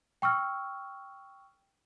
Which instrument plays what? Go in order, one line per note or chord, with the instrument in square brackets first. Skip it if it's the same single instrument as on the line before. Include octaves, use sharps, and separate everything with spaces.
[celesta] G5 C#6 E6 F6